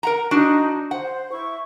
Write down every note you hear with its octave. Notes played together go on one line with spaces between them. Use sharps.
A#4 F#5 A#5
D4 D#4 F#4
C5 F#5
E4 C#6